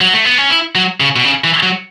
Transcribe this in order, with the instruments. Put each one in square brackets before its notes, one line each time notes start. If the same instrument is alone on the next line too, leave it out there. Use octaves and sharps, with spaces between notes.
[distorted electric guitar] F#3
A3
B3
C#4
E4
F#3
C#3
B2
C#3
E3
F#3